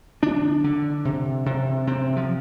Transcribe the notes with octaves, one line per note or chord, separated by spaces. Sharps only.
D3 D4
D3
C3
C3
C3 C4
F3